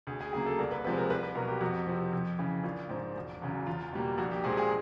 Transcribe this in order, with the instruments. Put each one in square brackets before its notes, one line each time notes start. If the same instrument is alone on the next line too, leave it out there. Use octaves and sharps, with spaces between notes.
[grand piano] D2 G#4
G#4
C#3 F#3 A#3 G#4
A4
C2 A#4
B4
C3 F3 G#3 B4
A#4
C2 B4
B4
B2 F#3 A#4
G4
F2 F#4
C3 F3
F2
C#3 E3
A#1 F4
G#2 F3
E1
E2 C#3 F#3
E2 F4
B2 G3 A#3
A#1 F#4
G4
A#2 F3 G#3 G#4
G#4